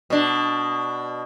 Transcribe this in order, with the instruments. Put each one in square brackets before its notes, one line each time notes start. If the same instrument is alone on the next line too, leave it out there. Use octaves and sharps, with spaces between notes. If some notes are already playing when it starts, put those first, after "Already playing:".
[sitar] B2 D4